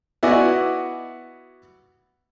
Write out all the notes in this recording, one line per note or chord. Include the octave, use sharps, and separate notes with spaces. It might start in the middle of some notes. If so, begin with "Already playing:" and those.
B3 E4 F#4 D5 D#5 G#5